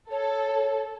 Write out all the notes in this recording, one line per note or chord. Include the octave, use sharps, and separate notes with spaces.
A4 C#5